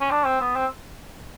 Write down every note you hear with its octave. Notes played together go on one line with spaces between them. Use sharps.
C#4
D4
C4
B3
C4